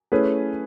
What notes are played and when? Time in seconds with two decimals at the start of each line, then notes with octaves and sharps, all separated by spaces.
0.12 A3 C#4 E4 G#4 B4